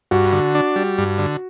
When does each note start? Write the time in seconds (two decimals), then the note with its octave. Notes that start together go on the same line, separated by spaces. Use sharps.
0.11 G2 F#4
0.32 D3
0.55 D4
0.76 G3
0.98 G2
1.19 D3